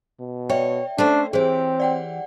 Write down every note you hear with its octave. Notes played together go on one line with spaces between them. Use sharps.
B2
C#5 D5 E5 G5
A3 C#4 D4 C5
E3 C4 G4 G#4 C5 C#5
D5 F#5 G5